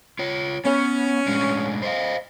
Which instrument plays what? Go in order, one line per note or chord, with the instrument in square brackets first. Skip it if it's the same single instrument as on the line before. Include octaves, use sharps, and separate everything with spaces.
[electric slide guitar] F4 C#5
[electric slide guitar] B3 [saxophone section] C#4
[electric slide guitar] A2 G#3 D4
C5 D#5 F5